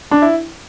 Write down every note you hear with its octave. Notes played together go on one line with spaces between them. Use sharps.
D4
E4